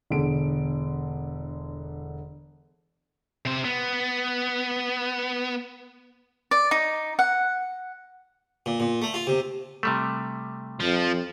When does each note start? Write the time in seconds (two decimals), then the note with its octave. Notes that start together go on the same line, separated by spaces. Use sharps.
0.11 E1 D3 D7
3.45 C3 C5
3.65 B3
6.51 D5
6.71 D#4
7.19 F#5
8.66 A#2
8.80 A#2
9.02 A3
9.14 F4
9.27 C3
9.83 C3 G3 A3
10.80 F2 F3